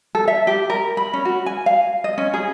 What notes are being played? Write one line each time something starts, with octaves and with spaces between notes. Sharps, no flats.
A4
E5
G4
A#4
B5
C#4
F#4
G#5
F5
D#5
C#4
G#4